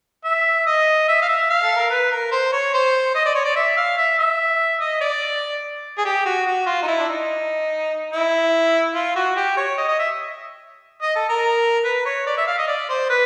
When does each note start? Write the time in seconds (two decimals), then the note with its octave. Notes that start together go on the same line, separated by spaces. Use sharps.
0.24 E5
0.66 D#5
1.08 E5
1.21 F5
1.29 E5
1.50 F5
1.63 A4
1.76 A#4
1.90 B4
2.12 A#4
2.31 C5
2.52 C#5
2.74 C5
3.15 D#5
3.25 D5
3.35 C#5
3.45 D5
3.56 E5
3.77 F5
3.97 E5
4.19 E5
4.80 D#5
5.01 D5
5.98 G#4
6.05 G4
6.26 F#4
6.47 F#4
6.66 F4
6.83 D#4
6.88 E4
6.99 D4
7.08 D#4
8.12 E4
8.95 F4
9.16 F#4
9.36 G4
9.57 C#5
9.77 D#5
9.88 D#5
9.99 E5
11.02 D#5
11.16 A4
11.29 A#4
11.85 B4
12.05 C#5
12.26 D5
12.37 E5
12.47 F5
12.58 D#5
12.67 D5
12.89 C5
13.09 B4